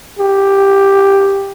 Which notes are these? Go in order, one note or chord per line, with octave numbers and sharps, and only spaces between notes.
G4